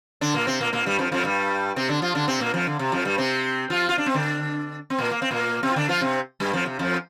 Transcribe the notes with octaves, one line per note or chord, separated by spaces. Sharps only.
D3 D4
A#2 A#3
C3 C4
A#2 A#3
A#2 A#3
G2 G3
F2 F3
F2 F3
G2 G3
C3 C4
D3 D4
F3 F4
D3 D4
C3 C4
A#2 A#3
F2 F3
D3
C3
F2 F3
G2 G3
C3 C4
F3 F4
F4
D4
C4
D3 D4
C4
A#2 A#3
A#3
C4
A#2 A#3
C3 C4
F4
D3 D4
F3 F4
C3 C4
G2 G3
F2 F3
C3
F2 F3